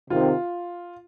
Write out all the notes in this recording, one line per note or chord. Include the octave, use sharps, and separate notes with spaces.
C3 D#3 C4 F4